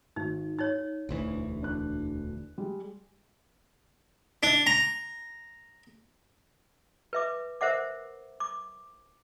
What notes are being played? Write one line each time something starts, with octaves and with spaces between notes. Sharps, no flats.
G#1 D#4
D#4 C#5 A6
E1 D2 E3
D4 F#6
G3 G#3
D4
A#5
B4 E5 D6
A#4 C5 E5 F#5 D6
D6